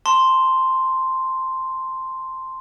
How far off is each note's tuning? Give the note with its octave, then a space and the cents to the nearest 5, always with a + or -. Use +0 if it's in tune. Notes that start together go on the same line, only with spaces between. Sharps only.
A5 +20 C6 +0